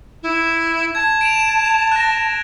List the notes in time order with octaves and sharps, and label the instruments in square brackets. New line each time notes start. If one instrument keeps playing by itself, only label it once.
[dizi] E4
[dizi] A5 [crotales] G#6
[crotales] D7 E7 F7
F#6 A#6